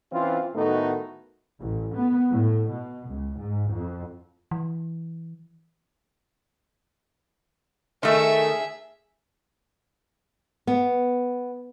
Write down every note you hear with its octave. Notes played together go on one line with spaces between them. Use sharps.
E3 C4 C#4 F4
A2 D#3 A3 B3 D#4 F#4
A1
B3
A2
B2
C#2
G#2
F2
E3
D#3 A3 G#4 E5
B3